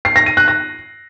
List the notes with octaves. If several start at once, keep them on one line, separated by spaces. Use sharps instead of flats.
C7
A#6
D#7
F#6
A#6